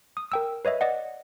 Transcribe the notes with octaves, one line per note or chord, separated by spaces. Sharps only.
D#6
A#4 G5 E6
B4 C#5 D#5 E5
D5 D#5 F#5